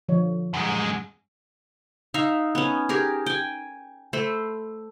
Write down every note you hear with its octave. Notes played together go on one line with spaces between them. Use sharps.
D3 F3 C#5
F#2 G#3
D#4 E5 F5
B3 C#4
G4 G#4 A#4
G5 G#5
A3 C5 B5